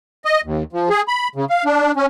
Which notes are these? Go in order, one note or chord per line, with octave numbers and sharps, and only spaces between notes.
D#5
D#2
F3
G#4
B5
C#3
F5
D4
C#4